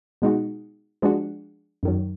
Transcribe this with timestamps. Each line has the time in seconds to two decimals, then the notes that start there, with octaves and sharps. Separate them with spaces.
0.22 B2 G#3 D#4 F#4
1.02 F3 G#3 D4 F#4
1.83 F#2 D#3 F#3